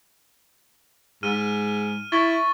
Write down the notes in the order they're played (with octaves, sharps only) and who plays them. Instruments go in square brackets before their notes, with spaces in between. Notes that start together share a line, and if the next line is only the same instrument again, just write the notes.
[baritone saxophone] G#2 [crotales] F6 D#7 G7
[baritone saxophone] E4 [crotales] C#6 A6 G7